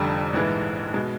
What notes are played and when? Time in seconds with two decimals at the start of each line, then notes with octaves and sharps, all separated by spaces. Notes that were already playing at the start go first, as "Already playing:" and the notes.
Already playing: F1 F2 D3 G3
0.33 A#1 G#2 E3 G#3
0.94 B2 G#3